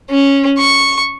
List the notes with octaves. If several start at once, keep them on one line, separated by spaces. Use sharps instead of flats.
C#4
C#6